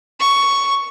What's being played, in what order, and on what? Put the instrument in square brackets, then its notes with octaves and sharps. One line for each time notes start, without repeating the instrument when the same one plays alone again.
[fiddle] C#6